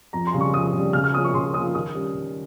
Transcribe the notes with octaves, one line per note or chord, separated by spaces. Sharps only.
F2 A#5
C6
C#3 G3
C#6
F2 D#6
C#3 G3
C#3 F6
F6
F3 A#3 C#4 D#6
C#6
C#3 C6
F3 A#3 C#4 D#6
D#3 D#6
G3 C#4 G4
D#3